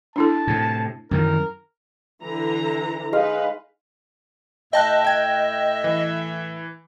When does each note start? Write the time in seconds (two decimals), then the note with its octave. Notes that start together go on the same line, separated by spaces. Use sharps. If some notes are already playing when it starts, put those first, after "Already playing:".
0.16 D4 E4 A4 A5
0.47 A2 C3
1.11 F#2 D#3 E3 A#4
2.22 D3 E3 A#5
3.13 G#3 D#4 B4 F5
4.73 A2 D#5 E5 G5 A5 F#6
5.05 G5 G#6
5.84 E3